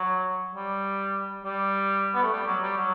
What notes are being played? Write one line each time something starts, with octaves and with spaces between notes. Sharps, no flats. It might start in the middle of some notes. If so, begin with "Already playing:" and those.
Already playing: F#3
G3
G3
B3
A3
G3
F#3
G3
F#3